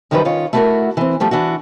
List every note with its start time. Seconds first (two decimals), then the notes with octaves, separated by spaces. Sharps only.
0.11 F#2 D#3 F3 G3 C#4 B4
0.25 D#3 C#4 F4 C#5
0.53 A3 E4 F#4 A4 A#4 F#5
0.97 E3 C4
1.20 F3 G3 A3 G4
1.31 E3 D4 F#4